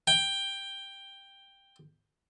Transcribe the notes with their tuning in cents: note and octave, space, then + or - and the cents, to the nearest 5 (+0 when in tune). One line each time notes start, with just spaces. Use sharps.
G5 +10